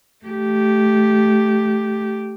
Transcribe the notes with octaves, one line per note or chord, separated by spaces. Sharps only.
A3 G4